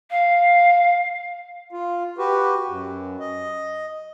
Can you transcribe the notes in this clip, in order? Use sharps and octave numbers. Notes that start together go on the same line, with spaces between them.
F5
F4
F#4 G4 B4
F#2
D#5